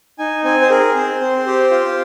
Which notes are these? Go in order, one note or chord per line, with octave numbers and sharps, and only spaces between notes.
D#4 G#5
C4 G#5
C5
G#4 A#4
C4 C5
C4
G4
F4